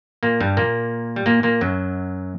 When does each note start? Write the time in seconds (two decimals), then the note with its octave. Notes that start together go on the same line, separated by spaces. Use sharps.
0.23 A#2 A#3
0.41 G2 G3
0.57 A#2 A#3
1.16 G3
1.26 A#2 A#3
1.43 A#2 A#3
1.61 F#2 F#3